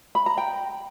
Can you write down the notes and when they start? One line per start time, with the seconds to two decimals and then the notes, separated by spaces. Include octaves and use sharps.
0.15 B5
0.26 A#5
0.38 G5